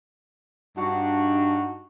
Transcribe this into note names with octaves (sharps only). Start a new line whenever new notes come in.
G2 D4 D#4 F#4